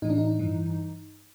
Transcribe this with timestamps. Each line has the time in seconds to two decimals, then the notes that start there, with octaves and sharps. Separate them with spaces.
0.02 A2 E3 D#4
0.10 D4
0.18 D#4
0.39 G2 E3